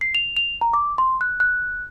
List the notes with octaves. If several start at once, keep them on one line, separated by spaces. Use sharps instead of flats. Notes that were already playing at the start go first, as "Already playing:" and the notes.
C7
F7
F7
A#5
D6
C6
F#6
F#6